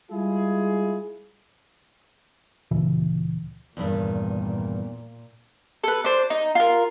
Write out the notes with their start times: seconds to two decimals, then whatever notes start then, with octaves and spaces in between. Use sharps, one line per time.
0.11 G3 G#3 E4 F4 G#4
2.71 D2 A#2 C#3 E3
3.77 E2 G2 A#2 D#3
5.84 A4 B4
6.04 D4 C5
6.30 D#4
6.55 F4 A#4